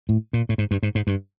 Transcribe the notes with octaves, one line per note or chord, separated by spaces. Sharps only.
A2
A#2
A2
G#2
G2
G#2
G#2
G2